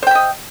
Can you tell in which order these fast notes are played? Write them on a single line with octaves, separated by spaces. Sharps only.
C5 G5 E5 D#5